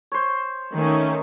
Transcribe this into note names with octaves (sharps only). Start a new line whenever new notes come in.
C5 C#5
D#3 A3 C#4